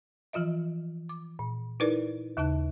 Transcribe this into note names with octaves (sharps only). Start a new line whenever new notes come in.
E3 F3 F4 D#5 E5
D6
A#2
D#4 E4 G#4 A#4 B4 D5
D#2 C#3 D#4 A5 F#6